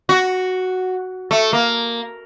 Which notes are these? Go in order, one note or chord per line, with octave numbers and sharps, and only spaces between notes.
F#4
A3
A#3